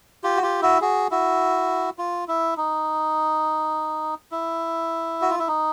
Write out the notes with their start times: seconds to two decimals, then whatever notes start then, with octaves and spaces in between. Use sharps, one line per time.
0.24 F4 G4
0.37 F#4
0.43 F4 G4
0.62 E4 F#4
0.81 F#4 G#4
1.11 E4 F#4
1.98 F4
2.28 E4
2.57 D#4
4.31 E4
5.22 F#4
5.30 F4
5.39 E4
5.48 D#4